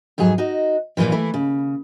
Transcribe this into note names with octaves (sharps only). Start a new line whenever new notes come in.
F2 G#2 F#3 G#4
D#4 F#4 D#5
D#2 A#2 C#3 E3 F3
E3 A3 E4
C#3